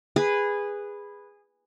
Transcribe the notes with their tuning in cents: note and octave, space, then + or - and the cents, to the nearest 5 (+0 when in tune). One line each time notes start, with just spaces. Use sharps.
G#4 -15 B4 +0